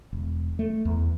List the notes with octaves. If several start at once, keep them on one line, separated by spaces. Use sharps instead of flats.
E1
A3
E2